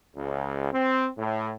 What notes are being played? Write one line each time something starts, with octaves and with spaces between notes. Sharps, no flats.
C#2
C4
A2